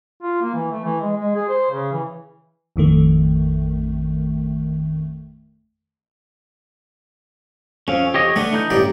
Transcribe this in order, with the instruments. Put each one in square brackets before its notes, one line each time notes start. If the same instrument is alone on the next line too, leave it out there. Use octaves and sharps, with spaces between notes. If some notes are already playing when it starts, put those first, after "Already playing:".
[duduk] F4
A#3
E3
A3
E3
G#3
G#3
G#4
C5
C#3
E3
[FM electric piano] A1 F2 D#3 A3
[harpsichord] F2 [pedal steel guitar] C#4 F5
[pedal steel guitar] G4 C#5 D#5
[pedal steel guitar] A3 [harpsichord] B3 D4
[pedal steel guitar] E3 D#4 G6
[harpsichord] A1 G2 D5